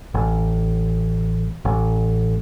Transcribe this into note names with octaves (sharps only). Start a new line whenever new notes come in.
A1
A1